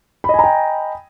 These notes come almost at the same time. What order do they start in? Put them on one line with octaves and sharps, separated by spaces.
B5 D#5 G#5 A#5 G5